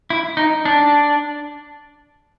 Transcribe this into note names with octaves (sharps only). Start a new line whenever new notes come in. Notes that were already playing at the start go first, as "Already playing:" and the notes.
E4
D#4
D4